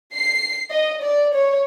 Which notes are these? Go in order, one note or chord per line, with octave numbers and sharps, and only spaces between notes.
C7
D#5
D5
C#5